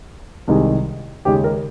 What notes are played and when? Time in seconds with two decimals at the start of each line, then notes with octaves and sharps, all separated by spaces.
0.48 C2 C3 D#3 G#3
1.25 D#2 C#3 G#3 G4
1.44 A#4